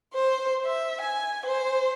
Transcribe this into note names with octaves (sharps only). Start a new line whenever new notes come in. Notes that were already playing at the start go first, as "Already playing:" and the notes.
C5
E5
G#5
C5